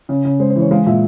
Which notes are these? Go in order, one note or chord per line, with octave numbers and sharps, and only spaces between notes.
C#3
C#3
G#3 C5
C5
E3 C#5
G#3 F5
A#2 E5